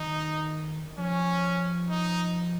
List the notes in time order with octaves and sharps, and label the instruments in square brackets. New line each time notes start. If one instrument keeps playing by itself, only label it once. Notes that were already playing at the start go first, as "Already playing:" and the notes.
Already playing: [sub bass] D#3 [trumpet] D#4
[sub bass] F3 [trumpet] C#4
[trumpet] D#4